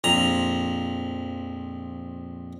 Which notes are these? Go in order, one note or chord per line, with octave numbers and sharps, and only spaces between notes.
A#1 F2 A#5